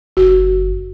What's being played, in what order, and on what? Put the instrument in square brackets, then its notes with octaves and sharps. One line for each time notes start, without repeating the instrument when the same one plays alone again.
[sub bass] F#1 [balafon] F#4